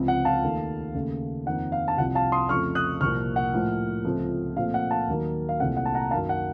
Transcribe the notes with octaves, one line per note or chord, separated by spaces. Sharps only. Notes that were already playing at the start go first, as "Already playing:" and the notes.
Already playing: C#2 C3 F3 C4
F#5
F5 A5
D#2 D#3 A3
D#2 C#3 A3
F2 D#3 A#3 F#5
F5
A5
C2 C3 F3 F#5
F5 A5
C6 D#6
F2 C#3 F3 A3 C#6 F6
D#6 F#6
C2 A#2 F3 A#3 C#6 F6
F#5
A2 F3 A#3
C#2 C3 F3 A3 C4
A#2 F3 A3 C4 F5
F#5
F5 A5
D#2 D#3 F#3 A#3
F5
C2 A#2 A3 C4 F#5
F#5
A5
F#5 A#5
F#2 D#3 A#3 F5 A5
F#5